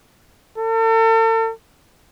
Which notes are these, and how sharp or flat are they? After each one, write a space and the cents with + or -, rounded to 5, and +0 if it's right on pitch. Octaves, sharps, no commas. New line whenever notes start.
A4 +40